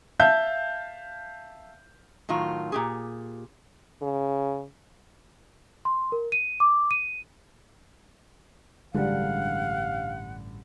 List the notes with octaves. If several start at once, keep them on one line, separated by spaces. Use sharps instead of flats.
E5 F5 A5 G6
A2 D#3 F#3 F4
A#2 G4 G#4
C#3
C6
A#4
D#7
D6
D#7
A1 G2 D3 G3 G#3 F5 F#5